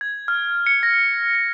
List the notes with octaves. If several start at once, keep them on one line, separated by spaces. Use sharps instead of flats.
G#6
F6
C#7
A#6
C#7